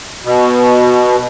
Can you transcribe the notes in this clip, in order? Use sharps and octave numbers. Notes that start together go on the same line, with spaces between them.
B2